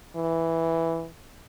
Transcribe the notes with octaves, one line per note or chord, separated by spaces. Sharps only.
E3